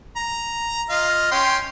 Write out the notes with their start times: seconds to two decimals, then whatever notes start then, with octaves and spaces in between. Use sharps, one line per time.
0.16 A#5
0.90 F4 D#5 F5
1.32 C#4 G5 C6